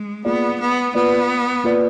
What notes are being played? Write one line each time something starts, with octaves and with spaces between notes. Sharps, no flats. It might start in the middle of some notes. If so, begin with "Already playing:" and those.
Already playing: G#3
A#3 B3 F4 G#4 D5
B3
A#3 B3 F4 B4 D5
A#3 F4 B4 D5